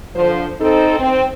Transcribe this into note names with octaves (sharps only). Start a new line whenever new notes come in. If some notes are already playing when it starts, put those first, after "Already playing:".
D3 F3 C5
C4 D#4 A4
C4